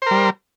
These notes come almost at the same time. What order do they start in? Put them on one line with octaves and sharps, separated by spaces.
C5 A#4 G3